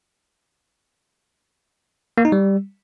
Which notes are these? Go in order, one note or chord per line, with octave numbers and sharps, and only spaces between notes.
A#3
D#4
G3